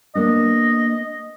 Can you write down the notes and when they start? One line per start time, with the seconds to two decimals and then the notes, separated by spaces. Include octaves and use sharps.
0.15 A#3 B3 D4 D#5